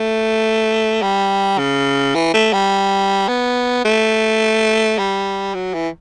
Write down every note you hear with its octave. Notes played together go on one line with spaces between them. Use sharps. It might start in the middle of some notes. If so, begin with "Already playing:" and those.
Already playing: A3
G3
C#3
E3
A3
G3
B3
A3
G3
F#3
E3